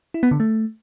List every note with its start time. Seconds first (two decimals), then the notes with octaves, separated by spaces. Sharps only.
0.14 E4
0.23 B3
0.31 D3
0.40 A3